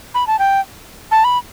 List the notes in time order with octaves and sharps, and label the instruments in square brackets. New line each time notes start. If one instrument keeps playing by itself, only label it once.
[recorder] B5
A5
G5
A5
B5